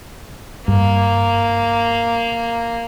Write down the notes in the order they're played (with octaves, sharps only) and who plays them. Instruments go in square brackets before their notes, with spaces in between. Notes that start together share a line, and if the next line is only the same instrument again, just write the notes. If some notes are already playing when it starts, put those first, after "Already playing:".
[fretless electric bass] G2 [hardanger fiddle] A#3